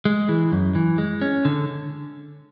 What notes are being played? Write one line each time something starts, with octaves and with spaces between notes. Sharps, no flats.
G#3
E3
F#2
E3
G#3
C#4
D3